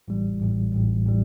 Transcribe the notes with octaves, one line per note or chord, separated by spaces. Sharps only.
A1 A2 E3 G3
A1 A2 E3 G3
A1 A2 E3 G3
A2 E3 G3